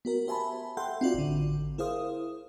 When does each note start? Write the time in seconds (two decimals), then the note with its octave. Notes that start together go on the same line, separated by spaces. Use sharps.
0.05 B3 F#4 A#4
0.27 G4 C5 E5 G#5 A5 B5
0.77 A4 E5 F#5 G5 C6 G6
1.01 C4 F4 F#4 D5
1.14 A1 D3
1.78 E4 G#4 A#4 C5 F5 D#6